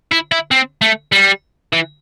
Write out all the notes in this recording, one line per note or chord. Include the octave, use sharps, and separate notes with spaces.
E4
E4
C4
A3
G3
E3